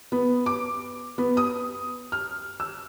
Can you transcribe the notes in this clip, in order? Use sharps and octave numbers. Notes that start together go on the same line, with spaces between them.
B3
D6
B3
D#6
F6
E6